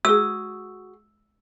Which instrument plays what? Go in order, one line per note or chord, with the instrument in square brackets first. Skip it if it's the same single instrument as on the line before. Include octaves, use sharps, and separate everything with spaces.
[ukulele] F#4 G#4 [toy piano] E6